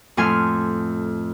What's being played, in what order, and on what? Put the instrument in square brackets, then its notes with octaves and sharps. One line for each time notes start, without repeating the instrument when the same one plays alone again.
[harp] F2 A2 G#5 C6 F6